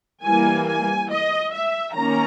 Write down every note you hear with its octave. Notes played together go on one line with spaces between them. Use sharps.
E3 G3 A#3 G#5
G#5
D#5
E5
D#3 A#3 C#4 A#5